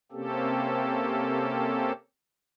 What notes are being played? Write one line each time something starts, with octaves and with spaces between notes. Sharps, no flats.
C3 A#3 C4 C#4 G4 A4